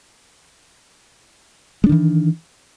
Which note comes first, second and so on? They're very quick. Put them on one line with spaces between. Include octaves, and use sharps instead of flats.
G#3 D4 D#3 E3